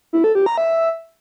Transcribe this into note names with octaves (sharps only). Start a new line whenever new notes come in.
E4
A4
G4
A#5
E5